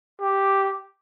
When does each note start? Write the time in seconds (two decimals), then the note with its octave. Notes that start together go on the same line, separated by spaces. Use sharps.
0.21 G4